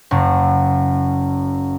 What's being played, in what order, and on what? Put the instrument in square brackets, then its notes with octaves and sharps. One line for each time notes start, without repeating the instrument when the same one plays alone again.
[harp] F#1 F#2